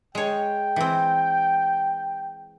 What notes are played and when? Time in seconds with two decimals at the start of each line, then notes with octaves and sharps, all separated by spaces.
0.15 G#3 C#5 G5
0.76 E3 C4